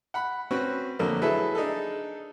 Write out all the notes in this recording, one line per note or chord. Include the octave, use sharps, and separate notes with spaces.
F#5 B5
C4 C#4 F#4 B4
F2 D3 F#3 A3 A#3
F#3 E4 G#4 A4 B4 E5
D4 D#4 G#4 A4